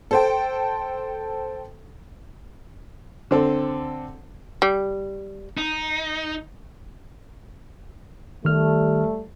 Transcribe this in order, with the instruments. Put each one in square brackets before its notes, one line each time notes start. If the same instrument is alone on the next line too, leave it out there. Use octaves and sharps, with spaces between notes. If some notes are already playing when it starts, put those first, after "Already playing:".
[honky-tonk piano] A4 C5 G5
[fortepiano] D3 C4 A4
[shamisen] G3
[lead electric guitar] D#4
[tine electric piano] D#3 F6 [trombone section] G3 A3